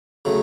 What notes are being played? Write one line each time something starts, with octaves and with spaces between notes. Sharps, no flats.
C#3 F#3 A3